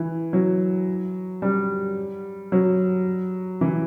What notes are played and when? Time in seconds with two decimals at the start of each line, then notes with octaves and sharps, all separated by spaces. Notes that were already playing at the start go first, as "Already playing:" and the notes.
Already playing: E3
0.33 F#3
1.42 G3
2.52 F#3
3.61 E3